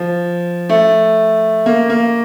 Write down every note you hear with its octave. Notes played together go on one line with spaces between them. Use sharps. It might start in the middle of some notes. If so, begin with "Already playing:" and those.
Already playing: F3
A3
A#3
A#3